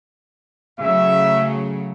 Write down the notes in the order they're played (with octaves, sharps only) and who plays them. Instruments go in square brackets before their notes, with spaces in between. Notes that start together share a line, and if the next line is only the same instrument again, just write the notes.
[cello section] C#3 F#3 A3 [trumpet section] E5